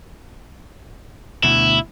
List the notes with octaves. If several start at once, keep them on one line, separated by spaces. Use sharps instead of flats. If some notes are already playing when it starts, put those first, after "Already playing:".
D2 B2 E4